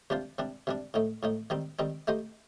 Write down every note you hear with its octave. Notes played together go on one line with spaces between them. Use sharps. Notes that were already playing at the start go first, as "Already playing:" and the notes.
C3 G3 D4 F4 C5
C3 G3 D4
C3 G3 D4
A2 A3 D#4
A2 A3 D#4
D#3 G3 C4 D#4
D#3 G3 C4 D#4
A3 D#4 G4 C5 D#5